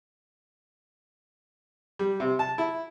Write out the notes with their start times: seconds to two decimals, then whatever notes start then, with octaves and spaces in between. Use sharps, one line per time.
1.99 G3
2.20 C3
2.39 A5
2.58 E4